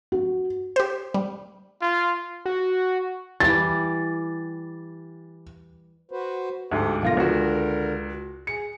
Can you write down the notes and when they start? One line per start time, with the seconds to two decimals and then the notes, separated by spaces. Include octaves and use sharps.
0.12 F#4
0.76 G4 C5
1.14 G3
1.82 F4
2.46 F#4
3.40 E3 G3 A6
6.11 F#4 B4 C5
6.72 D2 G#2 G4 A4 F#5
7.03 B1 D3 F4 A#4 A#6
7.17 C#2 F#4
8.47 G#4 C#7